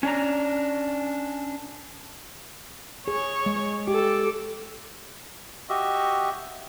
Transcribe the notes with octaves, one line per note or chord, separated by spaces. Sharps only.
C#4 D4 A5 A#5
G#4 C#5
G#3
G4 A4 D6
F#4 G4 D#5 E5